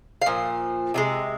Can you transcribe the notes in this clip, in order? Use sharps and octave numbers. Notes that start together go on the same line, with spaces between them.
F5
A#2 F3
C3 F3 G#3